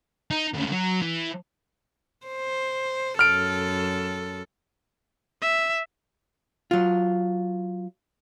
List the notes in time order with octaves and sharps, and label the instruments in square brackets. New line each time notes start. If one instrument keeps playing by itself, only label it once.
[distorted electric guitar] D#4
D2 C#3
F#3
E3
[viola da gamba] C5
[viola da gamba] F#2 A4 [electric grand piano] F6 D7
[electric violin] E5
[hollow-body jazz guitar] F#3 F4